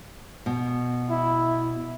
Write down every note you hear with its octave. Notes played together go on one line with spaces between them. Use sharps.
B2
E4